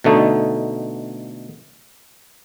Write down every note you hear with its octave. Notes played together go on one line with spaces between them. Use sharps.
B2 D3 A3 D#4